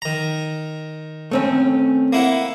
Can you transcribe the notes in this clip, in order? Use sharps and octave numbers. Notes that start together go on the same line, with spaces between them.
D#3 A#5
A3 C4 C#4
A#3 E4 F#5